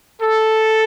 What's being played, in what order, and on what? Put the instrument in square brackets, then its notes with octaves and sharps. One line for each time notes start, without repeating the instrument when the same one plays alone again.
[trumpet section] A4